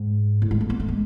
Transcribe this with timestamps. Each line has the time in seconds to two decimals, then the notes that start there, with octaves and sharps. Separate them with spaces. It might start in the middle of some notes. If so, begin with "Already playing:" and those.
Already playing: G#2
0.42 A2
0.51 G#3
0.61 A3
0.70 B3
0.80 A3
0.88 G#3